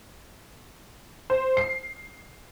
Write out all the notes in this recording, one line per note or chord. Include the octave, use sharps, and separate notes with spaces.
C5
C7